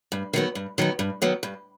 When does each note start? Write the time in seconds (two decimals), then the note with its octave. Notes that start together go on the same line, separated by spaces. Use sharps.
0.12 G2
0.33 D#3 F#3 B3
0.55 G2
0.78 D#3 F#3 B3
0.99 G2
1.22 D#3 F#3 B3
1.43 G2